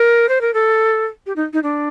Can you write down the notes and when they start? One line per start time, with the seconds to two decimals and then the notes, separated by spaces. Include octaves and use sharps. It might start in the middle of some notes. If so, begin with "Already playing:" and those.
Already playing: A#4
0.29 C5
0.41 A#4
0.54 A4
1.26 G4
1.36 D#4
1.53 D#4
1.63 D4